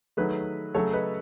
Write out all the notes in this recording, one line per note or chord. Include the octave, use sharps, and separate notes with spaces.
D#3 F#3 A3 G#4 B4
C#3 F#3 A3 A4 C#5
B4 D#5